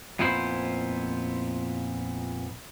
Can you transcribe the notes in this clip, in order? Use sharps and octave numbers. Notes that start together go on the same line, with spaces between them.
F2 A#2 B3 E4 C5 B5